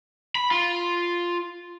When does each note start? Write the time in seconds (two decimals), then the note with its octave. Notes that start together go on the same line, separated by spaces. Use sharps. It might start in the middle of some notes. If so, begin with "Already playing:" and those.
0.35 B5
0.51 F4